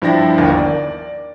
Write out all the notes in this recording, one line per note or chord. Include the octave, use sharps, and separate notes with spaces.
G2 F3 D4 E4 G5 A#6
G1 D#2 D4 A#4 G5
D5